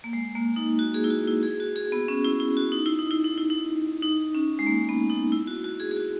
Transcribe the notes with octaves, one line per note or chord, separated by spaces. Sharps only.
A#3
G#3
A#3
D#4
F#4
G#4
E4
F#4
E4
G#4
F#4
G#4
B3
C#4
E4
E4
F#4
D#4
E4
D#4
E4
D#4
E4
D#4
D#4
C#4
G#3
A#3
B3
D#4
E4
F#4
F#4
G#4
G#4
F#4